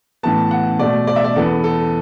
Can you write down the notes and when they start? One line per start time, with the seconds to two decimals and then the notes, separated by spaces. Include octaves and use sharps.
0.23 A2 E3 B3 A5
0.51 F#5
0.79 B2 A3 D5
1.07 D5
1.16 E5
1.24 D5
1.36 E2 E3 B3 A4
1.64 A4